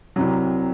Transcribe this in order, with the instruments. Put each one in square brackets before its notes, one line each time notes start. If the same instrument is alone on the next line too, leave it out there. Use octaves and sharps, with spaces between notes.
[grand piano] C2 C3 F#3